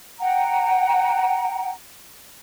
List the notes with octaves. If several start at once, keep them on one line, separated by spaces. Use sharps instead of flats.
F#5 G5 A#5